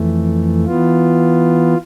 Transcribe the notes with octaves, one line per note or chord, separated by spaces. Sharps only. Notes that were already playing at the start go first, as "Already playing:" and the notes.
Already playing: F2 E3 A3
E3 B3 F4